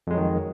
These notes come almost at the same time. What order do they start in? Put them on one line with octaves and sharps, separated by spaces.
F2 G#3 F#3 D#3